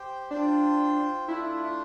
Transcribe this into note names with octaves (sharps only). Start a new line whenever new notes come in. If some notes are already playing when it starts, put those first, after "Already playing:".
Already playing: G4 C5 G5
D4 F4 C5 G5
A3 D4 E4 F4